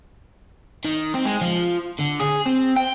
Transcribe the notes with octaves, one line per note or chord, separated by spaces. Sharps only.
D#3
C4
G#3
F3
D3
G#4
C4
G5